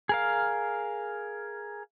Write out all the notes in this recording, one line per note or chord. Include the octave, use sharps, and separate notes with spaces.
G#4 A#4 F5